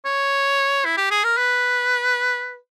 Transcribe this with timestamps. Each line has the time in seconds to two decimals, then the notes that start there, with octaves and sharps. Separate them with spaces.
0.05 C#5
0.85 E4
0.97 G4
1.11 G#4
1.24 A#4
1.38 B4